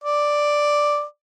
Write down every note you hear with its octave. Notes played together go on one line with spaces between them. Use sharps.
D5